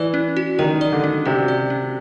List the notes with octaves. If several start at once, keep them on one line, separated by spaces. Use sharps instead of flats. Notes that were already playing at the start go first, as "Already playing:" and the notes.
Already playing: E3 D5
C#4
F#4
D#3 A#4
D5
D3
C#4
C3 F#4
D5
C#4